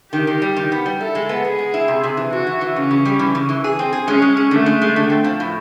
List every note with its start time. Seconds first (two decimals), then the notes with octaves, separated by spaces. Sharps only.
0.12 D#3 G4
0.27 D#3
0.42 G3
0.57 D#3
0.72 B3
0.86 G3
1.00 E4 A4
1.15 G#3
1.29 B3
1.44 B3 G#4
1.58 G#3
1.74 E4
1.88 C3
2.03 C3
2.17 E3
2.32 E3 F#4
2.47 E3
2.61 E3
2.76 C#3 C#4
2.91 C#3
3.05 G3
3.19 E3
3.35 C#3
3.49 E3
3.64 G#4
3.79 C4
3.93 G#4
4.08 G#3 C#4
4.22 G#3
4.37 G#4
4.51 D3 A3
4.66 G#3
4.82 G#3
4.96 D3
5.10 C4
5.24 F3
5.40 A2